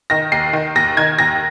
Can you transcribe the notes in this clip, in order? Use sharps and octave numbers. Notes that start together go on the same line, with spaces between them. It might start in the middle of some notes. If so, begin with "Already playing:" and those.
D#3 A#6
D#2 C7
D#3
D#2 A#6
D#3 G#6
D#2 A#6